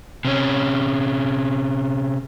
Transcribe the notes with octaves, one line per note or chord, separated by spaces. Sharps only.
C3 C#4